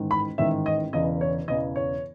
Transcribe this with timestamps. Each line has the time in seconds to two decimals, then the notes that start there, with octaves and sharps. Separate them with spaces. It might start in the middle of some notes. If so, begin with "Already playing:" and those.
Already playing: A1 G#2 D#3
0.11 B5
0.38 A1 G#2 D#3 E5
0.66 D#5
0.93 E1 E2 C#3 D#5
1.21 C#5
1.48 E1 E2 C#3 D#5
1.76 C#5